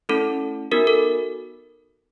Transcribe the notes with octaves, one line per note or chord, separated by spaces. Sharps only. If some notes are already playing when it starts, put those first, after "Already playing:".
A3 C#4 E4 A4
B3 D#4 F#4 A#4
A4